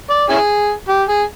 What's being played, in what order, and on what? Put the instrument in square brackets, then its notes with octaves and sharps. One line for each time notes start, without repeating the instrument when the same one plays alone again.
[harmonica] D5
C#4 E4 G#4
G4
G#4